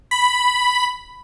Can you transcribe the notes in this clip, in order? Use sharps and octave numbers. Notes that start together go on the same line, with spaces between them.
B5